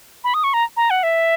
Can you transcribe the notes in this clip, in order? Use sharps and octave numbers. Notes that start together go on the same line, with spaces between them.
B5
D#6
C#6
A#5
A#5
F#5
E5